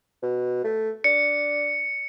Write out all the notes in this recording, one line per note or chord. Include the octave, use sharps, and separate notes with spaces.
B2
A3
D4 C#7